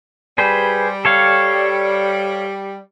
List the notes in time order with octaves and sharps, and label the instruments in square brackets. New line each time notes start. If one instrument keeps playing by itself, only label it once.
[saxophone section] G3 [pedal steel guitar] G#4 B4 C5
[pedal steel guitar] A4 C#5 F5